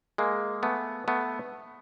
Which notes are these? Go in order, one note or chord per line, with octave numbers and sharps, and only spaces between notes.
G#3 A#3
A3 B3
A3 B3